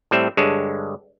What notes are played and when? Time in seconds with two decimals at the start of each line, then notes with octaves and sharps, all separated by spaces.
0.11 A2 G3 C4 E5
0.37 G2 D3 G#3 C#5 A5